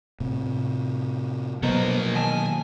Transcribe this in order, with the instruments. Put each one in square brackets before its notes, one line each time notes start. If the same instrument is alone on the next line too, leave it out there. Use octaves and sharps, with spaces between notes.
[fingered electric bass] A2 C3
[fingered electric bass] B2 F#3 A#3 [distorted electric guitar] F3 A#4 [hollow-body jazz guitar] B3 C5 D#5
[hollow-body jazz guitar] D#3 D#5 A5 [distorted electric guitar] G#5